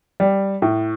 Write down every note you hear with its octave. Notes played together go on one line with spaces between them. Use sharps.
G3
A2